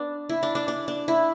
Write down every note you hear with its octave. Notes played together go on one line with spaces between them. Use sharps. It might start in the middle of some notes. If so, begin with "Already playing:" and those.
Already playing: B3 D4
E4
D4
D4
D4
D4
E4